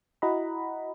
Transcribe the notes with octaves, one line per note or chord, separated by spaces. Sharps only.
E4 F#4 D#5 F#5 A#5 B5